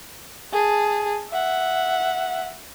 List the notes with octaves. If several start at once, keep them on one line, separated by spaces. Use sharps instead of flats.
G#4 A5
E5 F#5